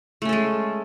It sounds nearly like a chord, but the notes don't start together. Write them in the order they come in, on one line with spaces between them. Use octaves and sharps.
A3 C#4 A4 G#3